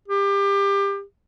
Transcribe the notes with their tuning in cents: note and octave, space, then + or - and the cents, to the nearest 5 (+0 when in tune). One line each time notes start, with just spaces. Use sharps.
G4 +25